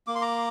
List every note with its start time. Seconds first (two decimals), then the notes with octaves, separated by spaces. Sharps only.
0.07 A#3 D6
0.15 C6
0.22 A#5 D6